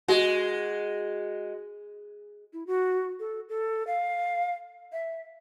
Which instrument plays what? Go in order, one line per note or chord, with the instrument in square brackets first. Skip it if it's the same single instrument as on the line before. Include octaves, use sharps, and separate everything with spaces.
[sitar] G#3 [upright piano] F#4
[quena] E4
F#4
A4
A4
F5
E5